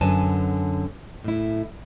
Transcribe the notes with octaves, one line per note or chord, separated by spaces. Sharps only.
F#2 D3 B4 G#5 A5
A2 E4